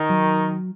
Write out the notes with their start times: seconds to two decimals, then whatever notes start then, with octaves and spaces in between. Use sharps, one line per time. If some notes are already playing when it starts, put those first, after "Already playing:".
Already playing: D#3
0.10 F#3